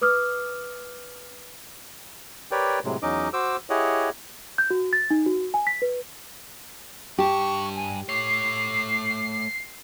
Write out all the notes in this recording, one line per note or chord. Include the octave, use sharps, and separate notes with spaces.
B4 D6 D#6 F6
G4 A#4 B4 C#5 D5 G5
A2 C3 F#3 G#3
E2 F#3 C#4 D#4 D#5 D6
F#4 C5 D6 E6
E4 G4 G#4 C#5 D#5 F#5
G6
F#4
A6
D#4
F#4
G#5
B6
B4
G2 G4 A5 C#6
G#5
A3 C#5 D6 C7